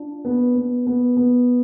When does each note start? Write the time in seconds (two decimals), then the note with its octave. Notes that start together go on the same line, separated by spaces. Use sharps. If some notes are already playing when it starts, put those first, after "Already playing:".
Already playing: D4 F4
0.25 B3
0.55 B3
0.86 B3
1.17 B3